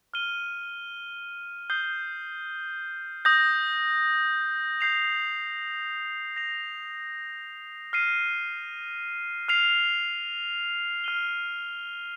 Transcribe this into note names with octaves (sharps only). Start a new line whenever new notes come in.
F6 D#7 G7
D#6 G6 C7 G7
D#6 G6 A#6
G6 C7 F7
A#6 F7
F6 C7 D#7
F6 C7 F7
F6 D#7 G7